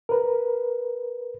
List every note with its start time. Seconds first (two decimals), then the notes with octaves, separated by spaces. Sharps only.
0.09 A#4 B4